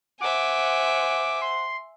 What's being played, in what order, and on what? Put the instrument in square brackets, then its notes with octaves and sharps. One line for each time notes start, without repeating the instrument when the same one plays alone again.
[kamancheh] C5 F#5 [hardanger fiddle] E5 G#5 [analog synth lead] D6
[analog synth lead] C6